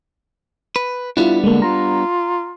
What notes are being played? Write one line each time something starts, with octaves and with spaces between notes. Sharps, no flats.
B4
G3 B3 D4 E4 F4
D3 G#3 A#3
F4 A#5